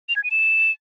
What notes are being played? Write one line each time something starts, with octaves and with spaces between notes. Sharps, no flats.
F7
G#6
D#7
E7